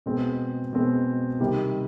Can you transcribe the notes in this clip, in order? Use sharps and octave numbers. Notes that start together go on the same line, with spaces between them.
B2 G#3 C4
B2 G#3 C4
C3 D#3 G3